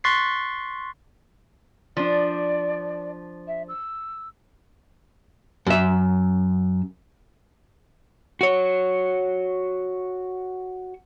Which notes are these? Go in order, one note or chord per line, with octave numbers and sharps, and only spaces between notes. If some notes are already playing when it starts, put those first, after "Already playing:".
C6 C#6 F#6 A6 B6 C7
F3 D4 D5
E5
E6
F#2 E5
F#4 C#5